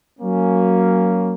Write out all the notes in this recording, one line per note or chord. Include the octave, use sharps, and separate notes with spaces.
F#3 A#3 C#4